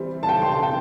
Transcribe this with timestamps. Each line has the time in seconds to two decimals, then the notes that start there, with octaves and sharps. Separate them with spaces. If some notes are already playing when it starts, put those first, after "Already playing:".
Already playing: E3 G3 C4
0.23 A5
0.29 G5
0.42 C6
0.52 A5
0.63 G5